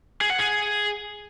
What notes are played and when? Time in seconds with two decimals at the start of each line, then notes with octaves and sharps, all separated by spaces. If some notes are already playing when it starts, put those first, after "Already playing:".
0.21 G#4
0.30 F#5
0.39 G#4